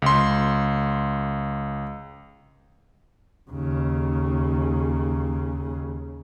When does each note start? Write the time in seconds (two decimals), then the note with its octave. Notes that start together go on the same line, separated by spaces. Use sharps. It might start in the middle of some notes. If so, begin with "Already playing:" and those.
0.02 C#2 C6
3.51 D#2 C#3